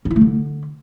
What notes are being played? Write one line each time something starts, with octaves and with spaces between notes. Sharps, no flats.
C#4
E4
A3
D3